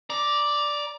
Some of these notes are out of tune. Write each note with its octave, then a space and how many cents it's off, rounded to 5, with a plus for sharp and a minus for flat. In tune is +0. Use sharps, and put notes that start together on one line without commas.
D5 +0 A#5 +25